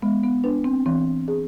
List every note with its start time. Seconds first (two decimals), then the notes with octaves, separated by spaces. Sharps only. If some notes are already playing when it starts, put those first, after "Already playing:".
0.02 G#3 B3
0.23 B3
0.44 D4 B4
0.64 C4
0.86 E3 C4
1.28 G#4